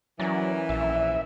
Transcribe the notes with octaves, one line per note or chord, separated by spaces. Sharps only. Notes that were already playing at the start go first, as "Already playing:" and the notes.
E3 F#3 C#4 A#4 D5
A#1 E5